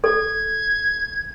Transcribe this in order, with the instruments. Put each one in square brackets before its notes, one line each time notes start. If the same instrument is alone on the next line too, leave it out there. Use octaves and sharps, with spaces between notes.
[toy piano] A4 [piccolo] G#6